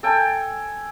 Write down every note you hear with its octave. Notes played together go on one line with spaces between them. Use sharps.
A4 G5 G#5